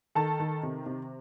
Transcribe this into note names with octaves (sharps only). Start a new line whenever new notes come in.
D#3 A4 A5
D#3
C3
C3